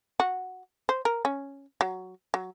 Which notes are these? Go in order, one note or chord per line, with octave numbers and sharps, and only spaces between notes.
F#4
C5
A#4
C#4
F#3
F#3